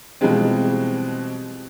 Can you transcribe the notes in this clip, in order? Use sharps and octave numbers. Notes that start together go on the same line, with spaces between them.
B2 E3 F3 G3 G#3 C4